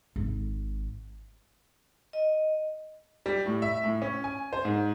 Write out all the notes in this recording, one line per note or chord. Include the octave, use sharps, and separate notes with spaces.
G#1
D#5
G3
A2
E5
A2
C#4
G#5
C5
G#2